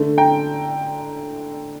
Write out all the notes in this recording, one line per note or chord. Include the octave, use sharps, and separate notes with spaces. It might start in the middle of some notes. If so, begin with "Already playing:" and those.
Already playing: D3 A3
G5 A#5